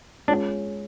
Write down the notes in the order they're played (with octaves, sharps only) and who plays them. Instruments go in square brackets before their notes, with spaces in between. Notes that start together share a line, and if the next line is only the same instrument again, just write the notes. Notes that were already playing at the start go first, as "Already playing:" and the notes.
[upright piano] G#3 C#4 F4 [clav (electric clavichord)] D4